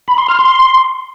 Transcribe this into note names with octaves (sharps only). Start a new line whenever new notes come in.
B5
C6
F6
C6